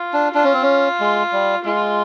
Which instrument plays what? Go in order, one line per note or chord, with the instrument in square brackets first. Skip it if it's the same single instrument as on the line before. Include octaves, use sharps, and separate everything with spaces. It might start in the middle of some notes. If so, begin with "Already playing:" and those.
Already playing: [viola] F4
[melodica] D4
[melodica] D4 [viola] F4
[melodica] C#4
C4
C#4
G#3
G3
[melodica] G#3 [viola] F4